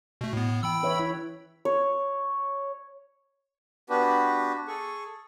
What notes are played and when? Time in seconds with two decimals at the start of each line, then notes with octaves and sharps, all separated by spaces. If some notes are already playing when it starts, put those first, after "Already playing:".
0.21 B2 A3
0.33 A2 B3
0.63 E3 G5 B5 E6
0.83 B4 C#5 E5
0.99 E4
1.65 C#5
3.90 B3 D4 F#4 G4 B4
4.68 G#4 A4 C#6